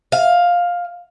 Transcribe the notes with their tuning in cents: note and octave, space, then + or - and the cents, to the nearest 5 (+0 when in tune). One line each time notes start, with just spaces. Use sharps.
F5 +10